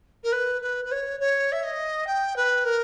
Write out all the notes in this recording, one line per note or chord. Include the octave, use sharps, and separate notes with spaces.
A#4
B4
B4
B4
C#5
C#5
E5
D#5
G5
B4
A#4